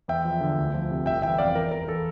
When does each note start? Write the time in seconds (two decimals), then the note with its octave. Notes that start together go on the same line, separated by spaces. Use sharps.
0.08 E2 E5 G5
0.25 F3
0.41 D3
0.57 D2
0.74 F3
0.91 C3
1.06 G1 E5 G5
1.22 E3 E5 G5
1.38 F2 D5 F5
1.55 E3 A#4
1.72 E2 A#4
1.87 E3 A4